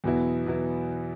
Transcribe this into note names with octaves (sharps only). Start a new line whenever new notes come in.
E2 B2 F#3 B3 E4
B2 F#3 B3 E4